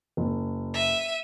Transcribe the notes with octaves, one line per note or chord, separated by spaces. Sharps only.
F#1
E5 D#7